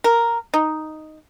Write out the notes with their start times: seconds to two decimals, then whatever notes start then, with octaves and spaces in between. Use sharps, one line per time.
0.04 A#4
0.54 D#4